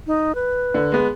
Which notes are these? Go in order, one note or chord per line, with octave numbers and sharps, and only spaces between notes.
D#4
B4
D3
G#3 B3